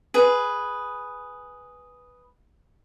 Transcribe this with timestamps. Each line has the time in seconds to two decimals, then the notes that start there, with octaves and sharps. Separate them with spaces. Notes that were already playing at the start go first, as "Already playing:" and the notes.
0.14 G#4 B4